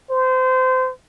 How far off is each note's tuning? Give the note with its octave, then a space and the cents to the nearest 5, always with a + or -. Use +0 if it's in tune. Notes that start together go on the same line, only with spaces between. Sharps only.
C5 -25